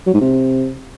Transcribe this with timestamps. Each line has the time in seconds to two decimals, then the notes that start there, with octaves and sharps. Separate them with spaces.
0.06 F#3
0.14 G#2
0.21 C3